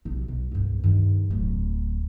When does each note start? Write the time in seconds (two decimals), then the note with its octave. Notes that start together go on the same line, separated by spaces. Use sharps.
0.05 B1 C3
0.28 B1
0.52 C2 G2
0.84 G2 D#3
1.30 D1 F#3